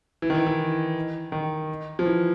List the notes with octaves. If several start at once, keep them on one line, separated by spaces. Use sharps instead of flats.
E3
D#3
E3
E3
D#3
F3
E3